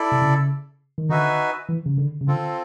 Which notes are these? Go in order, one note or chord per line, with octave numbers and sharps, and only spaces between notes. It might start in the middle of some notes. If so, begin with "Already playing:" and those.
Already playing: E4 A4 D5
C3
C#3
D#3
D3 D#4 F#4 B4 E5 G#5
E3
C#3
D3
C#3
D3 C4 F4 A4